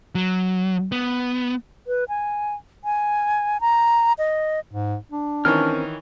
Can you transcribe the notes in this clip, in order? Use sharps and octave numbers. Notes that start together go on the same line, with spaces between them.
F#3
B3
B4
G#5
G#5
A#5
D#5
G#2
D4
D#3 E3 C4 C#4 A#4 C#5 F6